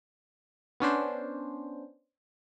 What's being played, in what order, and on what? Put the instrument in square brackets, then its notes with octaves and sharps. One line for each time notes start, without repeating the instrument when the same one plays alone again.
[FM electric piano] B3 C#4 D4 C5